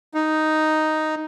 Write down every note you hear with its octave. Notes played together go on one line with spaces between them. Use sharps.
D#4